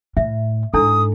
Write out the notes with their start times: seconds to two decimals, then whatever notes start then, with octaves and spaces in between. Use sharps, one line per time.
0.17 A2 E5
0.74 G#2 D4 E4 A4 D#6